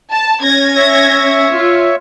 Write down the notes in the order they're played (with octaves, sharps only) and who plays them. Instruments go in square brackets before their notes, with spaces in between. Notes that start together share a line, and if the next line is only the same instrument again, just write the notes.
[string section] A5
C#4 G#6 A#6
[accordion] C#5 E5
[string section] F4